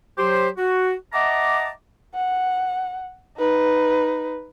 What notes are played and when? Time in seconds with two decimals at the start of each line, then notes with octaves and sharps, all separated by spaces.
0.18 F#3 G4 C5
0.58 F#4
1.13 D#5 E5 F#5 A5 A#5 D6
2.15 F#5
3.37 D#4 B4